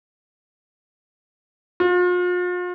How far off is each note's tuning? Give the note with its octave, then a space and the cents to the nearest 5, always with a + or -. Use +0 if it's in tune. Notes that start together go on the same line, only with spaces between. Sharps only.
F4 +40